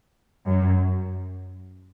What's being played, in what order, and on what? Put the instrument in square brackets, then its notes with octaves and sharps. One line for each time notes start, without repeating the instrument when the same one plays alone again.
[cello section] F#2